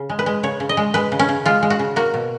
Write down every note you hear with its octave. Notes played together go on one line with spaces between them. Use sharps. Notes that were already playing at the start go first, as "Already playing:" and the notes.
Already playing: C#3
G#3
B4
G#3
C#3 C#5
C#3
D#5
G#3
G#3 B4
C#3
C#4
C#3
G#3 F4
G#3
F#4
C#3
A#3 F#4
B2